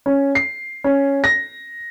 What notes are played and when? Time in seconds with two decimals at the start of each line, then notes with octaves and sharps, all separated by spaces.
0.06 C#4
0.35 C7
0.84 C#4
1.24 A#6